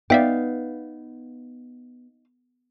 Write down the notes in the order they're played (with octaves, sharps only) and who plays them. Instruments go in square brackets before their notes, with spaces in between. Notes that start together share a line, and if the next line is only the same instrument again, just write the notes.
[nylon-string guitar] B3 [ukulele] D#4 F5 [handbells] D5 E5 G5